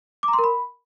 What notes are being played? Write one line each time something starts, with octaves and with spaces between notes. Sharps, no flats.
D6
A#5
C6
A#4
B5